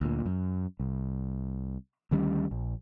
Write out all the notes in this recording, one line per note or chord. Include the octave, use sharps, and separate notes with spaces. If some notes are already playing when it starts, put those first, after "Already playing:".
D2 A#2
F#2
C2
D2 D#3 G3 C#4
A#1